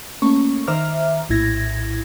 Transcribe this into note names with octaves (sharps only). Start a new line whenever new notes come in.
A3 A#3 C#4 C#6
D#3 C5 E5 A#5 D6 F6
A#1 A2 E4 G#6 A#6